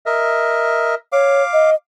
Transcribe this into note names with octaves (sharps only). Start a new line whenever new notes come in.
A#4 D#5 E5
C#5 F5 D6
D#5